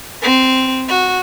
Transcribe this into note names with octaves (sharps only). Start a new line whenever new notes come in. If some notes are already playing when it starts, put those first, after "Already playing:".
C4
F#4